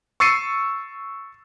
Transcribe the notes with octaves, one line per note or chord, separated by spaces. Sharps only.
C#6 E6 A6 C7 C#7 D#7